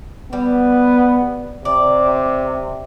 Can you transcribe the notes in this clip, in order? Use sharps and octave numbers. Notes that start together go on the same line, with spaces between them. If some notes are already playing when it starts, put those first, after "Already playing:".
G3 B3
C3 D5